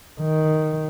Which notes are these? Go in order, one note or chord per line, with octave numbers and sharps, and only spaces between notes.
D#3